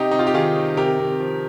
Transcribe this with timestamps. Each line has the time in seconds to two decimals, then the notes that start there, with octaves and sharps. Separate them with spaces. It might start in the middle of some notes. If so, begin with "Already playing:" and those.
Already playing: C3 D#4 G4
0.11 C3 D#4
0.19 F4
0.27 G4
0.34 D#3 F4 G#4
0.56 D#3
0.77 C3 G4 A#4
0.99 C3
1.20 F3